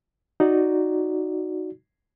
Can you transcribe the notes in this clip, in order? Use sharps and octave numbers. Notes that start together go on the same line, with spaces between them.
D#4 F#4 D5